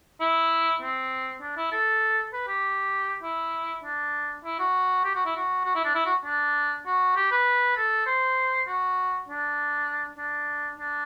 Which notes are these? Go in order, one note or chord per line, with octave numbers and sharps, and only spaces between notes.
E4
C4
D4
E4
A4
B4
G4
E4
D4
E4
F#4
G4
F#4
E4
F#4
F#4
E4
D4
E4
F#4
D4
F#4
G4
B4
A4
C5
F#4
D4
D4
D4